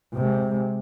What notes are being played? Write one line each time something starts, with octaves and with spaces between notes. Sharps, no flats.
C3 G#3